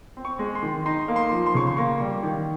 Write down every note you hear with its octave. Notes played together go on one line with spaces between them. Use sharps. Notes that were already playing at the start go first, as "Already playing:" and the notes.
C4
C#6
G#3
C6
D#3
D#4 C6
A#3
C6
F3
C6
C#3 C#6
C6
A#3 C#6
G3
D#3